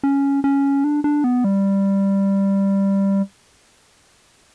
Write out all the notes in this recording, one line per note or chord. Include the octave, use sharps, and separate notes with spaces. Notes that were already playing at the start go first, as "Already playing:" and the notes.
C#4
C#4
D4
D4
B3
G3